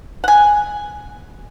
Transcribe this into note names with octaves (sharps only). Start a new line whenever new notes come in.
F#5 G#5